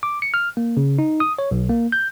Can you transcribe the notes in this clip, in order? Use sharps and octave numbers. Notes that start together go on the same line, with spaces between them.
D6
C#7
F6
A#3
C#3
D#4
D#6
C#5
B1
A#3
G6